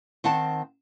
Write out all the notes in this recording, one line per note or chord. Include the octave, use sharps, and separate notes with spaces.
D#3 C4 F#5 A5